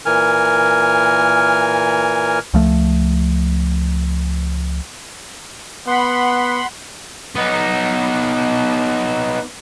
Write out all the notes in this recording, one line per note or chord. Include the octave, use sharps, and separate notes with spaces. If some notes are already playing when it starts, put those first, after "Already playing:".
A#2 E3 A#4 G#5 F6
C#2 F3 A3
B3 F#5 B5 C6
B3 D#4